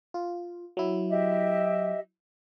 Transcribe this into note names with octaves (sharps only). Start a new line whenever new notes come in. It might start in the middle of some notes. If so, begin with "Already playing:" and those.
F4
F#3 E4
G4 D#5 E5